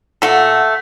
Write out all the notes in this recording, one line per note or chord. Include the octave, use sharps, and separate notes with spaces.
A#2 A3 A4 F#5